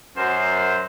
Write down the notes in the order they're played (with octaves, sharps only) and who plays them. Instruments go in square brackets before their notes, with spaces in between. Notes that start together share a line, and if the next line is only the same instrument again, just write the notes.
[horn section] F#2 C5